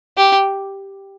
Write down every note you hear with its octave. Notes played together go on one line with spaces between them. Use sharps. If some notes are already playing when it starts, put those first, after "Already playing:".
G4